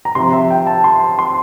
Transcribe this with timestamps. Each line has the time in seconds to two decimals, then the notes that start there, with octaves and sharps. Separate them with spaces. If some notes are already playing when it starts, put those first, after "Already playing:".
0.05 A#5
0.15 C3 F3 C6
0.33 E5
0.51 G5
0.67 A5
0.84 C6
1.19 C6